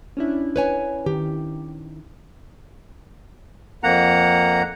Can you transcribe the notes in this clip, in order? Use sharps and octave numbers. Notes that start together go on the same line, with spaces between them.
C#4 D4 E4
B4 C#5 G#5
D#3 G4
F2 A#3 F#5 A#5